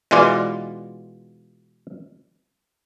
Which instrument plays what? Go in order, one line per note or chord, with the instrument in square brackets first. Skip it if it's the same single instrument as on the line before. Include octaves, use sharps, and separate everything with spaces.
[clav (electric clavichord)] B2 E3 G#3 F4 D5